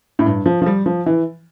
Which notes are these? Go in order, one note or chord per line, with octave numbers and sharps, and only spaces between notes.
A2
G2
F3
F3
G3
F3
E3